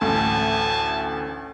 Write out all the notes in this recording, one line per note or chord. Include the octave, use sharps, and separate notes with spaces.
A1 D2 G#5 A5